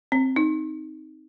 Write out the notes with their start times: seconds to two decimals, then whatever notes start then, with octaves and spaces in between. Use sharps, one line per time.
0.12 C4
0.36 D#4